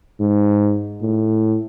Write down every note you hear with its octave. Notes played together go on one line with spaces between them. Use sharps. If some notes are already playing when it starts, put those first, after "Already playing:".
G#2
A2